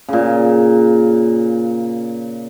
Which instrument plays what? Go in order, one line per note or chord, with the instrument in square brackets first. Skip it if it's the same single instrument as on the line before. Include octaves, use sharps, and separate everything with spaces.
[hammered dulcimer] A#2 C#3